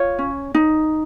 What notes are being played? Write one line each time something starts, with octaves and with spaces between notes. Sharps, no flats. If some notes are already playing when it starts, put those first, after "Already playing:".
Already playing: F4 C#5
C#4
D#4